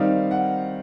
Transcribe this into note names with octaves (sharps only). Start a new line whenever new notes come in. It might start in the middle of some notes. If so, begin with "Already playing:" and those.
Already playing: D#3 G3 C4 D#4 F5
F#5